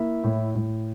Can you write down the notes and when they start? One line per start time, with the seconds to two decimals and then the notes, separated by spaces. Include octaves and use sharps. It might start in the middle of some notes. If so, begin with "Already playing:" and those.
Already playing: A#3 E4 E5
0.24 A2
0.55 A2